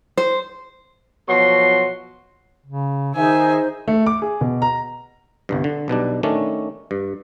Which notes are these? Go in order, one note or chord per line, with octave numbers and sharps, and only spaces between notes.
C5
B2 F3 F#3 F#4 C6
C#3
D#3 D#4 G#4 C5 E5 G#5
A3
D6
G#4
B2
A#5
G1 C2 G2
D3
B1 B2 G3 D4
D#3 A3 C#4 D4
G2